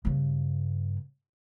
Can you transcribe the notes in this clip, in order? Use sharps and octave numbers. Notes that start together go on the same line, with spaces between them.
G2 C#3